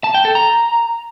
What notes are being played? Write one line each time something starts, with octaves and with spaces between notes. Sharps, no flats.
A5
G5
A4
A#5